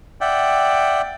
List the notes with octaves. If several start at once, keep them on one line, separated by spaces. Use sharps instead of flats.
D5 E5 F#5 G5